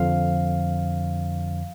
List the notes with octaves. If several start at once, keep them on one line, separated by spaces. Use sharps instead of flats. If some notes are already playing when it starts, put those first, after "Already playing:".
Already playing: F2 D3 F3 F5